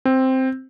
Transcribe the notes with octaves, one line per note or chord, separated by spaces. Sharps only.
C4